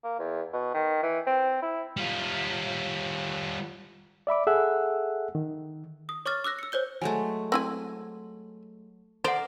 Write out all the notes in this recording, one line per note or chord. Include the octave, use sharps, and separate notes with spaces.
A#3
E2
B2
D#3
E3
C4
E4
G3 F4
D5 E5 B5 D6
G#4 A4 E5 F#5 E6 F#6
D#3
D#6
C#5 C#6 D6 F6 A6
D6 E6 F#6 A#6
E6 C#7
C5 C#5 G6 G7
F#3 G#3 A3 G#5
C4 E4 G#5 C6
A4 A#4 C5 D5 F#5